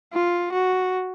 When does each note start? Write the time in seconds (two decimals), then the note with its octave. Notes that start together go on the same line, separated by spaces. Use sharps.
0.13 F4
0.52 F#4